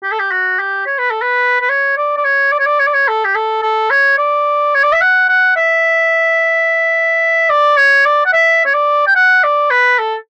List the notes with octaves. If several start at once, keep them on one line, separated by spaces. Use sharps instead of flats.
G4
A4
G4
F#4
G4
C#5
B4
A4
B4
B4
C#5
D5
D5
C#5
D5
C#5
D5
C#5
D5
C#5
A4
G4
A4
A4
C#5
D5
C#5
D5
E5
F#5
F#5
E5
D5
C#5
D5
F#5
E5
C#5
D5
G5
F#5
D5
B4
A4